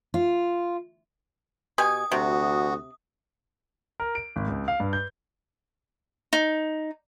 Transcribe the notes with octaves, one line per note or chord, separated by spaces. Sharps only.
F4
B2 G4 G#5 D#6
D2 C3 F#4
A#4
D7
G#1
C#2
F5
G2
G6
D#4